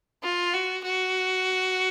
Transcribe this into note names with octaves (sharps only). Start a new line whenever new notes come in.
F4
F#4
F#4